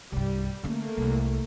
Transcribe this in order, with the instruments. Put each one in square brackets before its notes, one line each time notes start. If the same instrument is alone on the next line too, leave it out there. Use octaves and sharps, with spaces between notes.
[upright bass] C2 G2 [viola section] G3
[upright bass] D3 C#4 [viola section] A3 A#3
[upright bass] C2